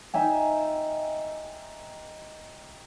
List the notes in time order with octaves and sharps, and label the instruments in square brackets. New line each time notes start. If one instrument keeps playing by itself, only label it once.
[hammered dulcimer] D#4 E5 G5 G#5